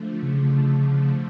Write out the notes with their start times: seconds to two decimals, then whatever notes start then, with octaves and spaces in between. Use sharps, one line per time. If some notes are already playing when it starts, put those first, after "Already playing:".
Already playing: D3 F3 A3
0.23 C#3